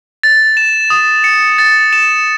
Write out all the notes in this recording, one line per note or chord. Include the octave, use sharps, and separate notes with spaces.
A6
E7
D#6
C#7
A6
E7